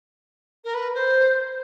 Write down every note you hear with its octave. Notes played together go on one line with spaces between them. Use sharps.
A#4
B4
C5